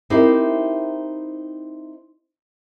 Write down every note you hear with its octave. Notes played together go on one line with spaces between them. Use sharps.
C4 D#4 E4 G4 A#4 C5